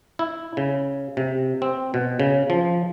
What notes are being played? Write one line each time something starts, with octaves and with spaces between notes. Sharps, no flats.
E4
C#3
C3
C4
B2
C#3
F3